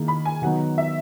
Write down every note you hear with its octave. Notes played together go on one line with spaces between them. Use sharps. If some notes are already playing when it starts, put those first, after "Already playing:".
Already playing: D#3 A#3 E4 G#4
B5
G#5
D#3 F#3 B3 D#4 F#5
E5